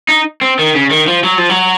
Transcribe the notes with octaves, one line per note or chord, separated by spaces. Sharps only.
D#4
C4
D#3
C#3
D#3
F3
F#3
F3
F#3